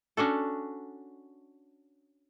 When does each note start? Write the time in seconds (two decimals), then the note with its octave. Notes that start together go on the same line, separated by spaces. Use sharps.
0.17 C#4 D4 F#4 A4